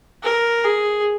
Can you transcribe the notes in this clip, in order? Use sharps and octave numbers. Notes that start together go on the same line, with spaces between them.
A#4
G#4